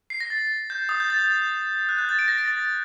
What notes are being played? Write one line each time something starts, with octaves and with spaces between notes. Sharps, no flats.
C7
A#6
A6
G6
D#6
G6
A6
G6
F#6
G6
A6
D7
A#6
A#6
A6